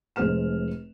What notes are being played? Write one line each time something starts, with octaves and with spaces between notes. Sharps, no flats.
F1 G#3 C5 F6 E7